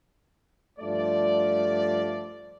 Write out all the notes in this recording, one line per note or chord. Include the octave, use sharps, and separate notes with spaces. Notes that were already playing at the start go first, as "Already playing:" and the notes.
G2 F3 A3 D5